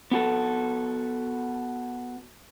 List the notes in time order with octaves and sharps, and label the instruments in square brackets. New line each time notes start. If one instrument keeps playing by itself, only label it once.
[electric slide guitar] B3 F#4 A4